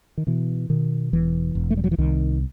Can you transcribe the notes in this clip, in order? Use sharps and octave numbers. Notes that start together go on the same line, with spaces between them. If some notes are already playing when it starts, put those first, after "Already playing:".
D#3
B2 E3
B2 D#3
E1 E3
E1
A3
G3
F#3
E3
C2 D#3